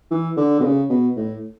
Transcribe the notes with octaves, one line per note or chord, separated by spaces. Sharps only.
E3
D3
B2
C#3
B2
A2